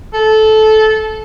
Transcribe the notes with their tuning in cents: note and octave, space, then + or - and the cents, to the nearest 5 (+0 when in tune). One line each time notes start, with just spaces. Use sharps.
A4 -20